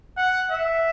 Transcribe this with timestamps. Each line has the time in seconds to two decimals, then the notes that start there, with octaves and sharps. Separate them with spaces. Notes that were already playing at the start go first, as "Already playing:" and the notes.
0.17 F#5
0.51 E5